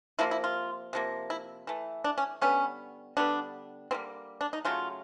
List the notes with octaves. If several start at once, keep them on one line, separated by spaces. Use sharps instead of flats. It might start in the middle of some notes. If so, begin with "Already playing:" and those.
C3 F3 A#3 E4
E4
F4
C3 F3 A#3
E4
E3 A3
D4
C#4
D3 G3 B3 C#4
D3 G3 B3 D4
D3 G3 A#3 C4
D4
D#4
C#3 F#3 A3 F4